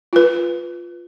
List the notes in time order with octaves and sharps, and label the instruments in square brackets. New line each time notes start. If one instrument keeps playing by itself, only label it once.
[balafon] F4 B4